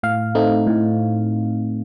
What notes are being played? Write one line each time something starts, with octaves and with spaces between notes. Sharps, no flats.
A2 F5
A3 C4 D#4
A2